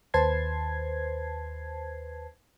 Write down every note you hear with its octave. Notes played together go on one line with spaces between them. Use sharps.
D#2 B4 C5 A5 G#6 C7